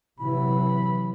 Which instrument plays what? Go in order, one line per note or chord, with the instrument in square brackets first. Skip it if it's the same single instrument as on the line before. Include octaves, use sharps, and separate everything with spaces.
[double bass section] C3 E3 F#3 [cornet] B5